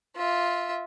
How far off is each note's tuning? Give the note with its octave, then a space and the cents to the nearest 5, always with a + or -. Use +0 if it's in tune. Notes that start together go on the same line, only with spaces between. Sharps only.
F4 +0 E5 -20